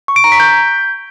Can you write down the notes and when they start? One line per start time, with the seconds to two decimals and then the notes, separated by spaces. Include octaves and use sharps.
0.08 C#6
0.16 D7
0.24 A#5
0.32 B6
0.40 G6